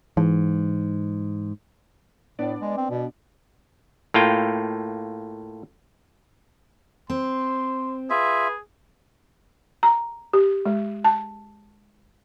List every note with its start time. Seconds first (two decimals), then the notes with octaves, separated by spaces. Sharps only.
0.17 G#2 E3
2.39 A2 B3 D4 D5
2.61 G#3
2.77 C4
2.91 B2
4.14 A2 A#3 F4 G5
7.10 C4 C6
8.10 F4 G#4 B4 E5
9.83 A#5
10.33 G4
10.66 G#3
11.05 A5